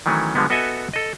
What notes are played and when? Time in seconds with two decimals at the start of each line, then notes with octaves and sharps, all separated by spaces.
0.06 D#3 E3 F#3 A3 C#4
0.35 D3 F3 G3 G#3 B3
0.50 B3 F#4 A4 D#5 E5 G#5
0.93 A4 D#5